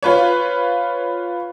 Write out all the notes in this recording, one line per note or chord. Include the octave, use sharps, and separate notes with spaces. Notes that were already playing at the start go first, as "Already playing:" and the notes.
F4 B4 C#5